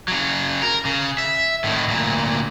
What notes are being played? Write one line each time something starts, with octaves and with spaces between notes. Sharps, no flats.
C#3 F#3
A#4
C#3
E5
A2 D#3
D2 A#2